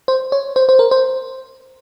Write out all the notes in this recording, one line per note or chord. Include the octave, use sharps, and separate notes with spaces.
C5
C#5
C5
C5
A#4
C5